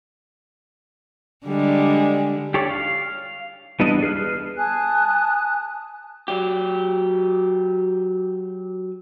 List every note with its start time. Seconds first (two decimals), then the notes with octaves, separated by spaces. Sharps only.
1.46 D3 G3 G#3
2.54 G4 A4 C#5 D5
2.70 F5
3.80 E3 G3 B3 D4 D#5
4.02 G#4 B4 F6 F#6
4.56 G#5 A5 D#6 F#6
6.28 F#3 G4